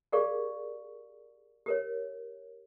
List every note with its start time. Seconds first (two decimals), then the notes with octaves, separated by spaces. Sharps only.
0.12 G4 G#4 A#4 D5 F5 C#6
1.66 G4 A#4 C#5